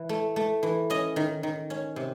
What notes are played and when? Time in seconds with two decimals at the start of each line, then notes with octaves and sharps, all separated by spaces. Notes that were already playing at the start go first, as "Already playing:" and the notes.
Already playing: E3
0.09 A3
0.36 A3
0.63 E3
0.90 C#4 D#5
1.16 D#3
1.43 D#3
1.70 C#4
1.96 C3